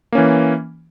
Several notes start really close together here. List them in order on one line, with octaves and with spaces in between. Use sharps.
A#3 C#4 E3